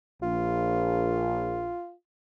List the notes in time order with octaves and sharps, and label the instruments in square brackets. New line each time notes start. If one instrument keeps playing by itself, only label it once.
[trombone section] A#1 [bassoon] F4